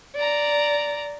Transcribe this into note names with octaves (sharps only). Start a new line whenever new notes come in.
D5 A#5